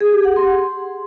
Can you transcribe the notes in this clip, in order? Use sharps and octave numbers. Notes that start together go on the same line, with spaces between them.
G#4
G4
F#5
C6